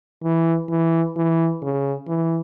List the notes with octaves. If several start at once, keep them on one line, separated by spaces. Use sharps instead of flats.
E3
E3
E3
C#3
E3